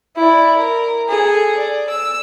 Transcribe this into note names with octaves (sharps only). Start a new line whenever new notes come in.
E4 D5
A#4
G#4 A4
D5
E6